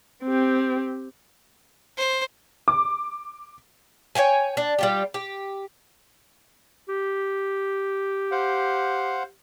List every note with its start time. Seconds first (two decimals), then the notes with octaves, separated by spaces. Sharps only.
0.23 C4 G4
1.97 C5
2.68 D6
4.15 C#5 F5 G5 G#5
4.57 D4
4.78 G3 F4 G4
5.14 G4
6.89 G4
8.31 C5 F5 F#5